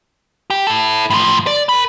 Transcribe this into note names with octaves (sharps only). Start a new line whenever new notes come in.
G4
E4 A4
A2 F3
D5
A#4 B5